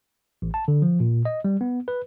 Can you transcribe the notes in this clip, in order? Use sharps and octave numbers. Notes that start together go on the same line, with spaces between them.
A1
A5
D3
F3
A#2
D#5
G3
B3
B4